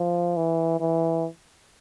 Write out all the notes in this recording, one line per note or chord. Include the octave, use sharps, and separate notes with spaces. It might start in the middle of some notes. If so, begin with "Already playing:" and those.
Already playing: F3
E3
E3